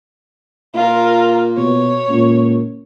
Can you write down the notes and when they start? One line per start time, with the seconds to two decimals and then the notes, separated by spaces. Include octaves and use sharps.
0.74 A#2 F4 A#4
1.57 B2 C#5
2.09 C#2 A#2